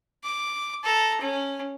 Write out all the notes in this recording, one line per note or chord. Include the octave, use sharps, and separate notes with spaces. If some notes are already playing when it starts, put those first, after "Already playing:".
D6
A4 A#5
C#4